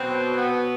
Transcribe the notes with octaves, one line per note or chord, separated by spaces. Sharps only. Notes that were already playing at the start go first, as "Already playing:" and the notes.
Already playing: B2 F#3 C4
B3